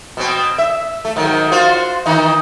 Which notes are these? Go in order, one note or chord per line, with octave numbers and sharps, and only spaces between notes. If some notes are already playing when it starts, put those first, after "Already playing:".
B2 C4
E5
A3
G#2 D#3 F#3
F4 F#4 C5
D#3 E3 D#4